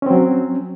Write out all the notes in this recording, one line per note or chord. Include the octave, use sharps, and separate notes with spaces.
F#3 C4 C#4